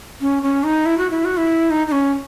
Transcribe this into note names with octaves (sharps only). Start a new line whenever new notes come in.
C#4
C#4
D#4
E4
F#4
E4
F#4
E4
D#4
D#4
C#4